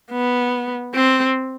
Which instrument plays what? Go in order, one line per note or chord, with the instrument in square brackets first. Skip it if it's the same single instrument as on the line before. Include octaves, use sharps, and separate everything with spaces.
[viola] B3
C4